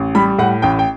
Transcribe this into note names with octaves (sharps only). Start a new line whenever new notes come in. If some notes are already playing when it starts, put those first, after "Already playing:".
Already playing: A1
G3 B5
A2 F#5
A1 G5
G5